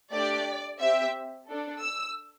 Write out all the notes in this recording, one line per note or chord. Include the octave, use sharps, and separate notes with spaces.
A3 D4 G4 D5
C4 G4 E5
D4 A4
E6